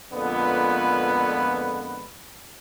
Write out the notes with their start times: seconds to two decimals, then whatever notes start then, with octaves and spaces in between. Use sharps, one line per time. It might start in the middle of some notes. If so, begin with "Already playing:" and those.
0.11 F2 A#2 D3 G#3 B3 B4